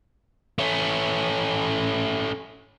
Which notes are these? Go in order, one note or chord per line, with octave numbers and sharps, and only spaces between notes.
A3 C#4